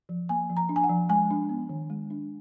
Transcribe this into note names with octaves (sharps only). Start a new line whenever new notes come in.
F3
A#3 G#5
F3
A#5
D4
G#5
F#5
F3
G#3 G#5
D4
B3
D#3
G#3
D4